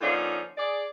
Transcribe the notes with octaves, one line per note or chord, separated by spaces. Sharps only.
A#2 D3 F3 C#4 D#4
G#4 D5